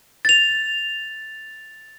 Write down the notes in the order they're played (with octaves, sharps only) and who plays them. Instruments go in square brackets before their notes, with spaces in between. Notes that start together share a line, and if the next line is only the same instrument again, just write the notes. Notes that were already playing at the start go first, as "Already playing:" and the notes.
[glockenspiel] A6 F7